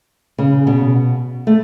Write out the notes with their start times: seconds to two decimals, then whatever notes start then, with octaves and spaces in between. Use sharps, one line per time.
0.38 C#3
0.67 B2
1.47 A3